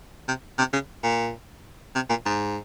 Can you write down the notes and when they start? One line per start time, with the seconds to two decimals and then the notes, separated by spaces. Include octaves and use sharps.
0.28 C3
0.58 C3
0.73 C#3
1.03 A#2
1.95 C3
2.09 A#2
2.25 G#2